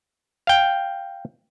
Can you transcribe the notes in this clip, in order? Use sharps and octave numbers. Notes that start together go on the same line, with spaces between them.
F5 G5